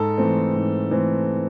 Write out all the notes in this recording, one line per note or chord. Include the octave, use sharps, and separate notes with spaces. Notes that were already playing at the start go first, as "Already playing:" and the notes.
Already playing: G#2 A4
E3 A3 C4
G#2
E3 A3 C4